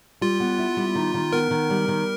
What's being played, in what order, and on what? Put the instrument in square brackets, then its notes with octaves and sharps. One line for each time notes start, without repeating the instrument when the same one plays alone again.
[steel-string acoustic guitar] G3 [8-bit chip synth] F4
[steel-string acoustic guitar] B3
E4
G3
D#3
D#3
[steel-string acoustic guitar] B3 [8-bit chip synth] A#4
[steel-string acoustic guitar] D#3
G3
D#3